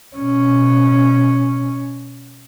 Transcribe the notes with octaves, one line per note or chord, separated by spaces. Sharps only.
B2 C#4